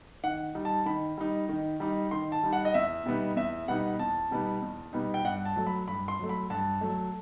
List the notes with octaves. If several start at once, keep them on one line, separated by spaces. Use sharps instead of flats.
D#3 F#5
G3 D#4
A5
D#3 B5
G3 D#4
D#3
G3 D#4
D#3 C6
A5
G3 D#4
F#5
D#5
E2 E5
B2 G3 B3 D#4
E2 E5
B2 G3 B3 D#4 F#5
E2 A5
B2 G3 B3 D#4
E2
B2 G3 B3 D#4
G5
G2 F#5
A5
F#3 A3
B5
G2 B5
C6
F#3 A3
B5
G2 A5
F#3 A3